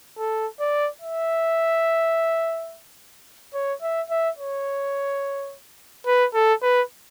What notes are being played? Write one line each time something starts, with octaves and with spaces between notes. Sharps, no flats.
A4
D5
E5
C#5
E5
E5
C#5
B4
A4
B4